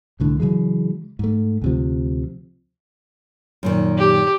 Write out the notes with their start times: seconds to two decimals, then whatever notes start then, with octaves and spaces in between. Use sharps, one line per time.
0.20 C2 A2 D3
0.40 C#3 E3 F#3 G#3
1.19 G#2 A3
1.62 D2 C3 F3
3.63 F#2 A#2 D#3
3.98 G4